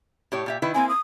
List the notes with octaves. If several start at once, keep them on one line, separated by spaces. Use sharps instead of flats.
A2 G4 C#5
A#2 G4 E5
D#3 E4 B4
A#3 C4 E4 G#5
D#6